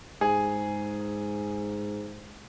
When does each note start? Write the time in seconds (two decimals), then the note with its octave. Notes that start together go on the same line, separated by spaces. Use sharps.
0.21 G#2 G#4